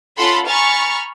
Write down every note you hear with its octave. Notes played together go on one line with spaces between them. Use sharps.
C#4 F4 A4 F#5 B5 C6
G#5 A#5 B5 C#6 F6 A6